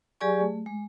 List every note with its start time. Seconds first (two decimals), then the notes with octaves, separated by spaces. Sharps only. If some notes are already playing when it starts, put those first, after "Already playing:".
0.21 F#3 G4 G#4 D5 G#5 C#6
0.40 A3
0.66 G#3